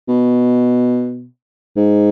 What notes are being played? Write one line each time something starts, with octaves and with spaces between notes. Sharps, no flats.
B2
G#2